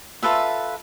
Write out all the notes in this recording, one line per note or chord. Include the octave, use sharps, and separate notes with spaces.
F4 A4 B4 E5